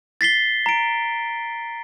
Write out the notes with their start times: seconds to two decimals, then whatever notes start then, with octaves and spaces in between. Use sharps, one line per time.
0.21 A6 B6 C7 G7
0.66 A#5 D7